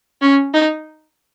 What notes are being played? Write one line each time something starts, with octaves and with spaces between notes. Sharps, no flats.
C#4
D#4